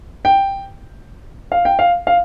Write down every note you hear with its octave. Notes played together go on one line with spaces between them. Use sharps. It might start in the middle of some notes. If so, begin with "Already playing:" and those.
G5
F5
G5
F5
F5